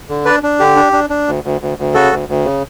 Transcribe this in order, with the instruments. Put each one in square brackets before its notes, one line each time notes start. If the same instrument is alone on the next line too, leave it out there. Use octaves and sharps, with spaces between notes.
[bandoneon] D3
D4 B4 D5
D4
D3 G4
D4
D4
D4
D2
D2
D2
D2
C#3 F#4 A4
D2
D2
C#3